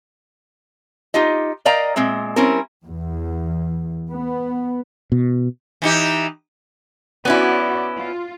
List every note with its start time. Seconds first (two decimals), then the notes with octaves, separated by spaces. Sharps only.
1.14 D#4 F4 G4 D#5
1.65 A#4 D5 D#5 F5 G5 A#5
1.96 A#2 G#3 C4 E5
2.36 G3 C4 C#4 E4 A#4
2.85 E2
4.09 B3
5.12 B2
5.82 E3 D#4 G4
7.25 B3 C#4 E4 F#4 D5
7.98 F4